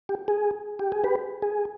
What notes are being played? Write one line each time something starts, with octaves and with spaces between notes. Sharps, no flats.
G4
G#4
G4
G#4
G4 B4
G#4